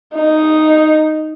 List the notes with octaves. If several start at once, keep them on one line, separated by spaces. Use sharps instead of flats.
D#4